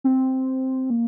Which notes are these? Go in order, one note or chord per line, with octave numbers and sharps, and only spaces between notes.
C4
A#3